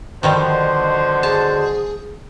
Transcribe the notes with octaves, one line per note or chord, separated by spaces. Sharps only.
B2 D3 D#3 F3 G3 C5 D#5
G#4 A5